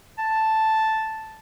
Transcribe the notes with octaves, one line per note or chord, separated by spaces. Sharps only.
A5